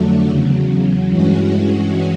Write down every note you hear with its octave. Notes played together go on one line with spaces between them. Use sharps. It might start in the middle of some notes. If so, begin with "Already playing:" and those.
Already playing: F2 D3 F#3 A3 D4
E2 C#3 F#3
G2 E3 G#3 C#4 F#4